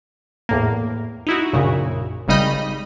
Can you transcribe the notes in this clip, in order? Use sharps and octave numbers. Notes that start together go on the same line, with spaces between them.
E2 A2 A#3
D#4 E4 F#4
A#1 F#2 A#2 C#3
G#1 C#3 G3 D#4 D#5 B5